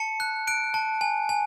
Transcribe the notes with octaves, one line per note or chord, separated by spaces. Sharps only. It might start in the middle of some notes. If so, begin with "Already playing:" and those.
Already playing: A5 C#7
F#6
F#6 D7
A5
G#5
G#5